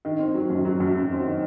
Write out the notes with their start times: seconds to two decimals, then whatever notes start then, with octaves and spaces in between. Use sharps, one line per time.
0.05 D#3
0.19 C4
0.34 F#3
0.50 F#2
0.65 F#3
0.80 F#2
0.96 F#3
1.11 C4
1.27 D#3